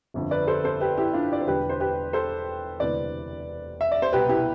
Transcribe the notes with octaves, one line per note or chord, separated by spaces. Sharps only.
G1 F2 D3
B4 D5
A4 C5
A4 C5
G4 B4
E4 G4
D4 F4
D5
C5
E1 E2 D3 G4 B4
C5
G4 B4
A4 C5
E1 D2 C3 E3 B4 D5
E5
D5
C5
C2 B2 G4 B4
E4 G4